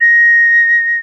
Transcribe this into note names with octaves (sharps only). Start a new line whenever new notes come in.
A#6